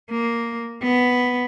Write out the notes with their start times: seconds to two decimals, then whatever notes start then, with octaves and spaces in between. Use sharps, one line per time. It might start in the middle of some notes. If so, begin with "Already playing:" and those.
0.11 A#3
0.82 B3